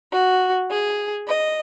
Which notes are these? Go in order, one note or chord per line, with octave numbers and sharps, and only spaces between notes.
F#4
G#4
D#5